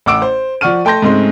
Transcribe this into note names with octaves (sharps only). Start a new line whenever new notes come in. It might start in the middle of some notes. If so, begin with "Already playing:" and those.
A1 F#5 D6 E6 D7
C5
F3 D5 F#5 C#6 F6 D#7
A3 G5 A5 C6 G6 A#6
G#2 C#3 G#3 A3 C4 C6